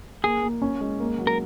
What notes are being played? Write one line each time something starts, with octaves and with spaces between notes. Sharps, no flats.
A#3 G#4
A#3
C#4
G#3
A#3
F#3
A#4